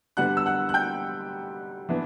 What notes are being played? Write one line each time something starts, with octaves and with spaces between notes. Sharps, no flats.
D3 G3 B3 D4 F#5 F#6
E6
F#5 F#6
F#6
G5 G6
E3 B3 D4